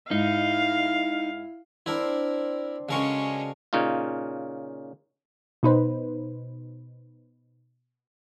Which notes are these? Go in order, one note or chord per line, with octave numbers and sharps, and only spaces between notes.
G#2 D#4 E4 F5
C4 D4 E4 A#4 C5
C#3 G#3 C#4 F#4 A4 A#4 C#6
A#2 C#3 C#4 D#4 F4
B2 D#4 B4 C5